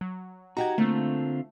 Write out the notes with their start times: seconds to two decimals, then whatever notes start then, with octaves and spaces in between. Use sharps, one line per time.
0.01 F#3
0.57 D#4 F#4 G4 F#5 A#5 G#6
0.78 D3 A3 A#3 C4 F4